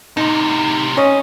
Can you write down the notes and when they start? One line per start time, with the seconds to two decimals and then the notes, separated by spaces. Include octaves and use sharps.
0.17 A2 C3 D#4
0.97 C#4 D#5